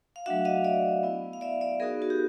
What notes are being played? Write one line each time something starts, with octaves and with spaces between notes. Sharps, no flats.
F5
F#3 A3 D4 F#4 E5 F#5
D#5 F5
D5 E5
B3 E4
F5
D5 E5
D5 E5
B3 D#4 F#4 G#4 A#4
F#4
G4